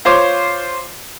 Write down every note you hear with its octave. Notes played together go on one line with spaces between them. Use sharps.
F4 C5 C#5 D6